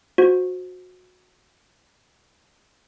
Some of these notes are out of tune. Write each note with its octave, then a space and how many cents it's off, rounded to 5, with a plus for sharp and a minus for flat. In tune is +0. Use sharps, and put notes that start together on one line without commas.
F#4 -20 C5 +0